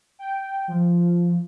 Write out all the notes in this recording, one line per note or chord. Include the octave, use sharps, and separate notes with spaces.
G5
F3